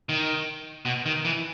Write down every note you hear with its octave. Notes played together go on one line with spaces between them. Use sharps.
D#3
B2
D#3
E3